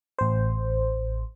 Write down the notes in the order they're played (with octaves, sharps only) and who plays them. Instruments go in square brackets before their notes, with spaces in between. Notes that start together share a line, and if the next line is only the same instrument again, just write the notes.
[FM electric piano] A1 C5